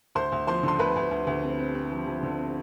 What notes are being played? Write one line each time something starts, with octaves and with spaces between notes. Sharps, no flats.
D2 C5 C6
D2
F3 C5 C6
D3 C6
D2 B4 B5
D2
D2
D2
C4
C4
C4
F3
F3
D3
C4